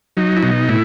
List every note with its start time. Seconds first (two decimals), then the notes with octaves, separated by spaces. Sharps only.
0.17 F#3 D#4
0.37 E4
0.42 B2 D#4
0.69 A2 E4